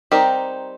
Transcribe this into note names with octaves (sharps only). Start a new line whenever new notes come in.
G3 C4 D#4 G4 A#4